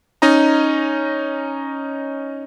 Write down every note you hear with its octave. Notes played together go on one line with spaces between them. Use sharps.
C#4 D#4 D#5 A#5